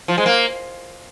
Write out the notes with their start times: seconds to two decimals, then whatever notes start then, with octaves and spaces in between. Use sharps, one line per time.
0.08 F3
0.18 G#3
0.26 A#3